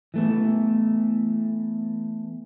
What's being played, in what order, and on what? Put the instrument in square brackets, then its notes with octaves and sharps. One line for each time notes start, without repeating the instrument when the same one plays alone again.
[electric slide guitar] E3 A3 B3